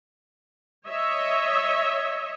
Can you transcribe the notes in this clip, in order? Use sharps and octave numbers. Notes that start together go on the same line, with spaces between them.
C#5 D#5 E5